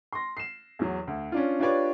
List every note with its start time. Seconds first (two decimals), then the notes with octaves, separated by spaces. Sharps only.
0.13 C6 A#6
0.37 C7 E7
0.79 E2 F#3
1.07 D2
1.32 C#4 D4 F4
1.60 D4 F4 G4 B4 C#5 D5